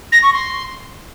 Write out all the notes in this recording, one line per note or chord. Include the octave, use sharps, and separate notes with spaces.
A#6
C#6
C6